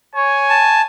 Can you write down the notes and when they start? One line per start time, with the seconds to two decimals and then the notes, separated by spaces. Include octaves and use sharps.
0.16 C#5 G#5
0.49 A5